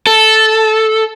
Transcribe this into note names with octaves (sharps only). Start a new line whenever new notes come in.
A4